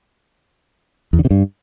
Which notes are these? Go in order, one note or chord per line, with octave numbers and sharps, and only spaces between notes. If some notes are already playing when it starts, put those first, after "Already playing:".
E2
D3
C3
G2